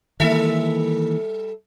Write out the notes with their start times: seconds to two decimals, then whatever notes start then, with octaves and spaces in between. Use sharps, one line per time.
0.20 D#3 E3 G3 A#3 A4 E5